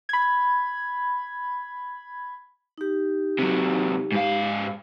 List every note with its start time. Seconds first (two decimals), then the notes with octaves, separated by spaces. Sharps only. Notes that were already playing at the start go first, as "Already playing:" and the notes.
0.09 B5 G#6
2.78 D#4 G4
3.39 C3 F#3
4.12 G#2 F5